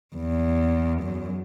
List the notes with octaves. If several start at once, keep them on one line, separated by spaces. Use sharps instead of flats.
E2
F#2